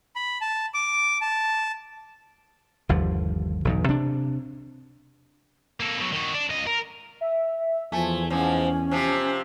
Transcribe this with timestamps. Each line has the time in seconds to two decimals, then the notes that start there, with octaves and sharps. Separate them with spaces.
0.16 B5
0.41 A5
0.74 D6
1.21 A5
2.89 G1 D#2 D3 F3
3.65 B1 E2 G#2
3.89 C3 D4
5.80 A#3 A4
5.98 B2 F#3
6.13 D#3 F#4
6.34 D4
6.50 C#2 D#5
6.67 A#4
7.21 E5
7.92 E2 F3 A3 G#5
8.30 G#2 F3 C#4 G#5
8.91 C3 F3